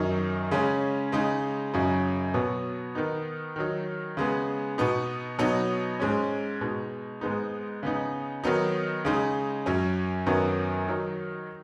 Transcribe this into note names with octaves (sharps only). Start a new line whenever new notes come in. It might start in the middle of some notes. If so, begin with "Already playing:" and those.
Already playing: F#2 D#3 F#3 D#4
C#3 G#3 C#4
C#3 G#3 D#4
F#2 C#3 F#3 D#4
B2 F#3 B3
D#3 B3 D#4
D#3 F#3 D#4
C#3 G#3 B3
B2 B3 D#4
B2 F#3 B3 D#4
G#2 G#3 C#4
B2 G#3 D#4
G#2 G#3 B3 D#4
C#3 B3 D#4
D#3 F#3 B3 D#4
C#3 G#3 D#4
F#2 F#3 C#4
F#2 D#3 F#3 B3
D#3 F#3 D#4